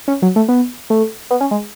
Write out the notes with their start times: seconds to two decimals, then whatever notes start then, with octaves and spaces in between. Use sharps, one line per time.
0.08 C#4
0.22 F#3
0.36 A3
0.48 B3
0.90 A3
1.31 B3
1.41 C#4
1.51 G#3